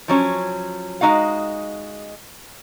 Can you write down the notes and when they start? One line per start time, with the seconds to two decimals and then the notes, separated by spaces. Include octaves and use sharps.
0.08 F3 F#3 C#4
1.01 G#3 C#4 D#4 F#4 F5